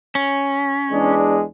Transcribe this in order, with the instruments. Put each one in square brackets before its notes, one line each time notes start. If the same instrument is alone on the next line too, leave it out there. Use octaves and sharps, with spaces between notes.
[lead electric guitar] C#4
[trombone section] E2 G#3 D4